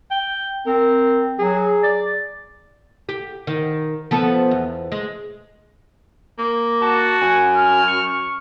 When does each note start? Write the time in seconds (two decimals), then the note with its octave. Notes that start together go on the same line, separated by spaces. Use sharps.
0.11 G5
0.67 C4 A#4
1.39 F#3 G#4
1.83 D5
3.09 G4
3.47 D#3
4.11 F3 B3 A4
4.51 E2
4.92 G#3
6.39 A#3
6.82 F#4 A5
7.21 F#2 G#5
7.57 F6
7.88 C#6